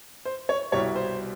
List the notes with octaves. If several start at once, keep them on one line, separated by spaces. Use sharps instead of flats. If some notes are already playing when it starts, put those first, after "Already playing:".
C5
C#5
C2 B2 G3 C#5
C5